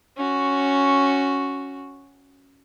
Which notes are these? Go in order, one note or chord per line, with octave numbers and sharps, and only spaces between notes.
C#4 F#4